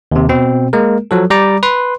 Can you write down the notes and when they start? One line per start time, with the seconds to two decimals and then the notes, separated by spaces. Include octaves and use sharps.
0.12 D#2 C3
0.29 B2 C4
0.73 G#3 A#3 A#4
1.11 F3 F#3 A4
1.30 G3 D5 A#5 D6
1.63 B4 C6